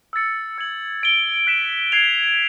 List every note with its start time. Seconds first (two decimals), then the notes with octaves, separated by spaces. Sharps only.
0.13 E6 A6 C#7
0.58 E6 G#6 C#7 F#7
1.03 A6 D7 G7
1.47 F#6 B6 E7
1.92 G#6 C7 F7